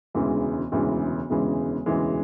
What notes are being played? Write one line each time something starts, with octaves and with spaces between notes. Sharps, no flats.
E1 D2 C#3 E3 G#3
E1 D2 C#3 E3 G#3
E1 D2 C#3 E3 G#3
E1 D2 C#3 E3 G#3